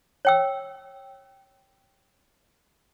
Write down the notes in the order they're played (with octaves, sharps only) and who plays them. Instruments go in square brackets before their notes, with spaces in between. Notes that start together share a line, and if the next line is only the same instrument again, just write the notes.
[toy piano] C#5 G5 E6